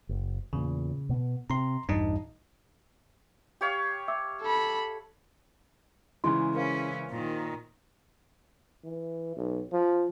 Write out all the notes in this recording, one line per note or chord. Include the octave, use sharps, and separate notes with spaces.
F#1
E2 A#2 C#3
B2 B3
C3 A#5 C6
A#1 E2 G2 D4 D#4 D#5
G4 C#5 F5
E5 D6 E6
A4 B5
C#3 E3 G#3 E4 C6
C#4 E4 A#4 C5 F5
A#2 D#3
E3
B1
F3